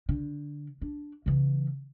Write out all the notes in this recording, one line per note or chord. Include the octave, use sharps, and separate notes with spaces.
D3
D4
C#3 E3